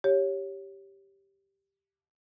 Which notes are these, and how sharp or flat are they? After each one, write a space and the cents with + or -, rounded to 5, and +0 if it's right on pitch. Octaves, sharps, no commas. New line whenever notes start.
G4 +0 C#5 +0